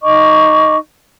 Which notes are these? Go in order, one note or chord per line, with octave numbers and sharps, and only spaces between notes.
D#4 D#5 C#6 D6